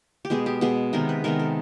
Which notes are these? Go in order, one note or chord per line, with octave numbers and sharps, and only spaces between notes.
G4
B2 G#3 B3 G#4
G4
B2 G#3 B3 G#4
C3 D#3 G#3 B3 A#4
B4
C3 D#3 G#3 B3 A#4
A4